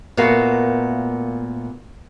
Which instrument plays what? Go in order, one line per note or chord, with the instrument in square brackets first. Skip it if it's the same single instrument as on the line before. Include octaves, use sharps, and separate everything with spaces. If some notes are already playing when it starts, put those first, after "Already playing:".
[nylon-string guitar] A#2 A3 B3 F#4 A#4 F5